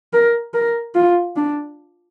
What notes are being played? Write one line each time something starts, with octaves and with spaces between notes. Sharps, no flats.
A#4
A#4
F4
D4